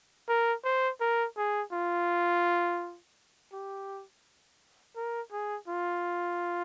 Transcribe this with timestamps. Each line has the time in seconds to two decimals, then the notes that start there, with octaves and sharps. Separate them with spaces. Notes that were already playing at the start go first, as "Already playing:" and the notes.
0.28 A#4
0.64 C5
1.00 A#4
1.37 G#4
1.72 F4
3.52 G4
4.96 A#4
5.31 G#4
5.68 F4